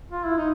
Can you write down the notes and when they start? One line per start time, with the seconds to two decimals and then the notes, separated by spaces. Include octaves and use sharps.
0.12 F4
0.25 E4
0.38 D#4